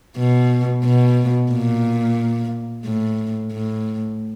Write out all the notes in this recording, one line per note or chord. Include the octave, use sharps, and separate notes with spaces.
B2
B2
A#2
A2
A2